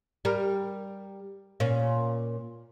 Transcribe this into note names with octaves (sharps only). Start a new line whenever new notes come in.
G3 A#4
A#2 C#4